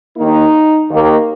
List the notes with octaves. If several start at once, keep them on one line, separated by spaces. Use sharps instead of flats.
D#2 D#3 A#3 D#4
D#2 D#3 A#3